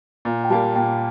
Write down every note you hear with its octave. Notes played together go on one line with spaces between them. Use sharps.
A#2
G5
G3 A#3 A5
A#2 G5